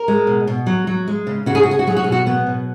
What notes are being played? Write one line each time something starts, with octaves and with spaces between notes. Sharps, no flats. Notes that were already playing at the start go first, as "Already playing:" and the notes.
Already playing: A#4
G#3
B2
B2
F#3
F#3
G#3
C#3
C#3 F#4
G#4
F#4
C#3 G#4
F#4
F#3 G#4
F#4
G#4
B2
F#4
F#3 B3
B2